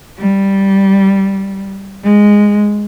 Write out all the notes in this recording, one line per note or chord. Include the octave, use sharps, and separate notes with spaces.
G3
G#3